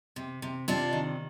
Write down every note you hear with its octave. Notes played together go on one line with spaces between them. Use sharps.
C3
C3
C3 D4 F4
D#3